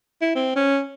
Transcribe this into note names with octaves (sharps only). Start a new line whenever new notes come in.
E4
C4
C#4